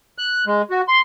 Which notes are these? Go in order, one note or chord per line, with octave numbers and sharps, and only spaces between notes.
F#6
G#3
F#4
C6